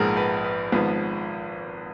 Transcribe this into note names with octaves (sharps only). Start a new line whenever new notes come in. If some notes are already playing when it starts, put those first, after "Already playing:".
Already playing: A#1 G#2 F3 B3 G#4 A#4 F#5
B4
B4
G#1 G#2 F3 B3 B4